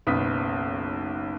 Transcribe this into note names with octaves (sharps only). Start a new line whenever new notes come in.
F#1 B1 B3 D#6 B6